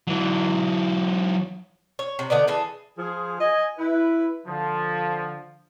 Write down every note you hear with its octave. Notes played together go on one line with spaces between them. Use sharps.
E3 F#3
C#5
C3
D3 B3 D#4 D5
E3 G#4 A4
F3 G#4
D#5 G#5
E4 B4
D3 F3